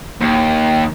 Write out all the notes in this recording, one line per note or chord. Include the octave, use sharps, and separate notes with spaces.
D#2